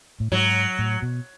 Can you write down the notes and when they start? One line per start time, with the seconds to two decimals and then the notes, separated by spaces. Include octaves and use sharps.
0.20 A2
0.32 G#2 F#3
0.79 A2
1.02 B2